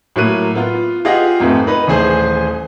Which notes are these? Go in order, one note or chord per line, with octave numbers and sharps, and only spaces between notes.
A2 F#3 A#3 F#6 D#7
B3 F4
F4 G4 G#4 D#5 F5 F#5
F2 G#2 A3 B3
D#4 B4
D#1 E3 A3 G#4 C5 G#5